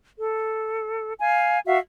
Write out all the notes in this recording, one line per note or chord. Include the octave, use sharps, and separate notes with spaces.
A4
F5 G#5
F#4 E5 F5